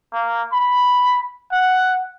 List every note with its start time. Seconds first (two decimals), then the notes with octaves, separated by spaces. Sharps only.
0.13 A#3
0.53 B5
1.52 F#5